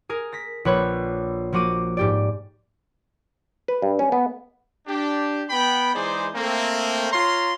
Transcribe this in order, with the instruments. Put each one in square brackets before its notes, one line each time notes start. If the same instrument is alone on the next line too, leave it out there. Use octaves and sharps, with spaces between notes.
[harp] G#4 A#4
A#6 B6
A#1 B4 C#5 B5
F3 A#3 F#4 D6 D#7
G#2 G4 D5
[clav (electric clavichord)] B4
G2
C#4
B3
[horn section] D4 G4
B3 G5 B5
E3 G#3 D#4 G#4 C5 D5
A3 A#3 C4
F4 C#5 A#5 C6